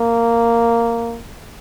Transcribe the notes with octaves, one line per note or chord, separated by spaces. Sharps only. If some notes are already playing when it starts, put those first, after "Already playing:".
Already playing: A#3